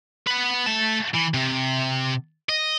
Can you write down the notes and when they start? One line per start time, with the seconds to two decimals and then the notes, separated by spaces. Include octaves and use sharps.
0.27 B3 B4
0.66 A3 A5
1.14 E3
1.34 C3
2.49 D#5